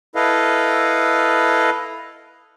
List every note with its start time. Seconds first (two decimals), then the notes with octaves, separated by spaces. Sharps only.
0.15 E4 A4 B4 D#5 F5